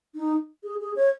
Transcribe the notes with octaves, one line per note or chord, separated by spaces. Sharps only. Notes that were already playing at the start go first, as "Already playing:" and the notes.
D#4
G#4
G#4
C#5